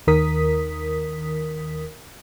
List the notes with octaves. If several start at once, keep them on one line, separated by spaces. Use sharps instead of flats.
D#2 D#3 A#4 D#6 B6